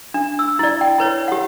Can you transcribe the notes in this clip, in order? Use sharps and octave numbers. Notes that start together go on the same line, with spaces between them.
D4
E6
E4 D5
G5
E4 B4 C#5
G4 F#5